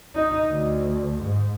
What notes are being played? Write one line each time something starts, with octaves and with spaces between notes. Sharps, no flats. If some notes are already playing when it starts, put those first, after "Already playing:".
D#4
D2
G#2